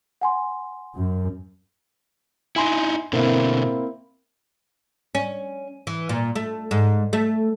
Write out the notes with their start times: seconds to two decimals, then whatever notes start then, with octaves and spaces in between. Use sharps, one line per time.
0.21 F#5 G#5 C6
0.96 F#2
2.56 D#4 E4 G#5 C6
3.13 B2 D3 A#3 C4 E4
5.15 C#4
5.87 E3
6.09 A#2
6.35 A3
6.71 G#2
7.13 A3